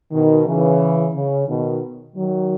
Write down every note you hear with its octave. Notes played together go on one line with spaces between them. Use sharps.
B2 D#3
C#3 E3
C#3
B2 D#3
D#3 F#3